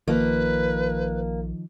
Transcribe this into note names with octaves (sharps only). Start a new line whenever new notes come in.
A#1 D#3 F3 A#3 B4